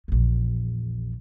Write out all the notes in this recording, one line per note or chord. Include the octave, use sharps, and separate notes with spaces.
A#1 E2